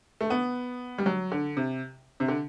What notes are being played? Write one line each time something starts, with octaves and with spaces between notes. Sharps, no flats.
A3
B3
G3
F#3
D3
C3
C3
D3